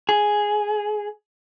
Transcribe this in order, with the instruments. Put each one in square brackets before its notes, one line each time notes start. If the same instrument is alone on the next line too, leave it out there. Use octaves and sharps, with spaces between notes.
[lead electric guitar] G#4